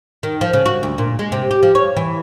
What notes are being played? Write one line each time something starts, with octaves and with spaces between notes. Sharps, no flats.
D#3
F3
C#3
F#4
D2
A#2
G#3
C3
G4
F3
C#5
E3